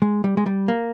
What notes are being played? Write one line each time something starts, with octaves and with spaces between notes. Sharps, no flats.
G#3
G3
G#3
G3
A#3